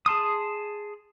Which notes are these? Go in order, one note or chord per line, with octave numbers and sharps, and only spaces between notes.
G#4 A5 C6 D#6